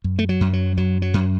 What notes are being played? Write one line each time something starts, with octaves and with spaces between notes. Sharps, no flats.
F#2
A3
F#3
F#2
F#3
F#2 F#3
F#3
F#2